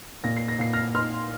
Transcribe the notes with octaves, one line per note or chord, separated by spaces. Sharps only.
A#2 A#6
C7
A#6
A#2 C7
F6 A#6
D#4 C6 F6